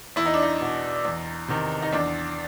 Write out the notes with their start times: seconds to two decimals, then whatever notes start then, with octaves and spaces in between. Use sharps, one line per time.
0.16 E2 E4
0.26 D#4
0.34 D4
0.42 D#4
0.61 B2
1.05 E2
1.48 C3 D#3
1.82 D#4
1.93 E2 D4